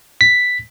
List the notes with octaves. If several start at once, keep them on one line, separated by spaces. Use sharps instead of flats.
B6